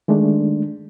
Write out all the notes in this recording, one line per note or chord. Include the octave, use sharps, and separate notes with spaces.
D#3 G#3 A3 D4